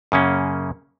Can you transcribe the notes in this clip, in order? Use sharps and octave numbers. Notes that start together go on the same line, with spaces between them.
F#2 C#3 A#3 C#4